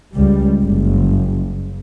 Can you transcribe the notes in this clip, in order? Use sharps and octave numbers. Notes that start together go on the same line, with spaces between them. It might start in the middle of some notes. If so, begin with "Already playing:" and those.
C#2 G3
F#1